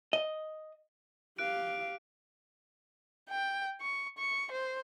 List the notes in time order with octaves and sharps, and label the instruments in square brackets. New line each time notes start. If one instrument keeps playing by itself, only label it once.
[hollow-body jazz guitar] D#5
[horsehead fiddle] G4 F5 [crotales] F#6 D7
[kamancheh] G5
C#6
C#6
C5